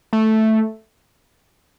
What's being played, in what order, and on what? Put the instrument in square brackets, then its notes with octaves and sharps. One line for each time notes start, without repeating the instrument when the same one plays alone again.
[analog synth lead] A3